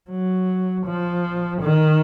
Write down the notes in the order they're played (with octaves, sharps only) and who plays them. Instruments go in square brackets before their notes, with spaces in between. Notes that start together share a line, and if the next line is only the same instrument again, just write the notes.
[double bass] F#3
F3
D#3